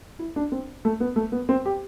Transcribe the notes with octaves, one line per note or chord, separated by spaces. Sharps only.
E4
D4
C4
A3
B3
A3
B3
C4
G4